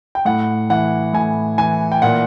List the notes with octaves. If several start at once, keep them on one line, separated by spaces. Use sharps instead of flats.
G5
A2 F#5
E3 F#5
A2 G#5
E3 G#5
G5
A#2 F#5